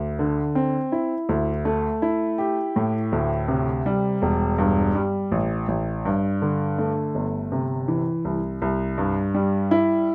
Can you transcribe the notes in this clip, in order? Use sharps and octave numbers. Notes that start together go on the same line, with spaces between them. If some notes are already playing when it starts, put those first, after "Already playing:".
Already playing: D2
D3
C4
E4
D2
A3
E4
G4
A2
D2
C3
G3
E1
G2
G3
A1
A1
G2
D3
A3
G1
C3
E3
C2
C2
G2
G3
E4